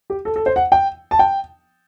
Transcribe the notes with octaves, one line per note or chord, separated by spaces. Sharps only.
G4
A4
A4
C5
F#5
G5
A5
G5